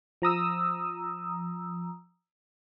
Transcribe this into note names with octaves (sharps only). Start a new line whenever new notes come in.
F3 A#5 D#6 E6